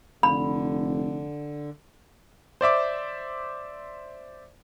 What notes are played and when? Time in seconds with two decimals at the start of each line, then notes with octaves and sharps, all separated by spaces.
0.23 F1 D3 B5
2.61 C5 D5 E5 D6